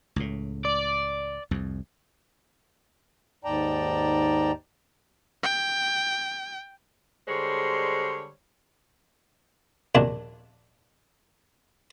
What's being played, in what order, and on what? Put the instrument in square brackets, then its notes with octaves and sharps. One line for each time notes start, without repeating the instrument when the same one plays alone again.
[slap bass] C#2 A2
[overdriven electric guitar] D5
[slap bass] C2 F2
[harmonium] D#2 G#2 D5 G5 A5 A#5
[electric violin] G5
[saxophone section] D3 G3 G#3 C5 C#5
[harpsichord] A#1 D#2 D4